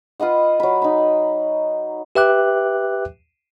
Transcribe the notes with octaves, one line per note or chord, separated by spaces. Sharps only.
F4 B4 D#5 F#5
F#3 B5
D#4 B5
G4 B4 E5 G5 D6 F#6